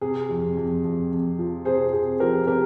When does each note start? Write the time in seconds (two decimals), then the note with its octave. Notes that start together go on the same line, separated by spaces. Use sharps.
0.01 C3 G#4
0.30 F2
0.57 F2
0.84 F2
1.11 F2
1.39 F3
1.65 C3 G#4 C5
1.93 C3 G#4
2.20 F3 G4 A#4
2.47 C3 G4 A#4